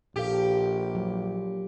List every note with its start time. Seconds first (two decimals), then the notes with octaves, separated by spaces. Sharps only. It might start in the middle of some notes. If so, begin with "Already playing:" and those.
0.16 A#1 A#2 G4 A4 F5
0.95 F#3